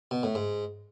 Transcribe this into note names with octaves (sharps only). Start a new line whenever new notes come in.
B2
A2
G#2